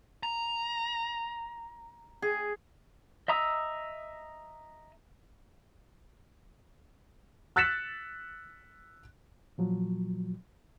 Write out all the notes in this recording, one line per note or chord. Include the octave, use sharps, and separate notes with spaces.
A#5
G#4
D#5 E5 A#5 D#6 E6
E6 F#6 A6 B6 C#7 E7
A#2 F3 F#3